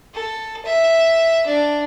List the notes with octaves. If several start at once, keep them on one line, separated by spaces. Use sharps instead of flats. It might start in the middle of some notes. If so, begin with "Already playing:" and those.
A4
E5
D4